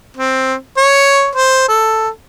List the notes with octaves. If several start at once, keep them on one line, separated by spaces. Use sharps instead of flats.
C4
C#5
C5
A4